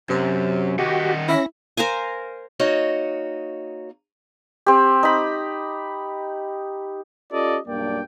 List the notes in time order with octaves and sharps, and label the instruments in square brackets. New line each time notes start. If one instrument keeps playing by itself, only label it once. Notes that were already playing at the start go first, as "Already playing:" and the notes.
[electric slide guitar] F#2 [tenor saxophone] C3
[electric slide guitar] D#3 D#5 F#5 [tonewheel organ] F#4 G4
[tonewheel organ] C#4 A#6 [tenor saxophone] E4
[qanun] A#4 C5 F5 G#5
[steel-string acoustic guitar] A#3 D#4 F#4 C#5 D#5
[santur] C4 G4
D#4 B5
[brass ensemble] C#4 F4 G4 A4 D5 D#5
B1 G2 A#3 D4 D5 G5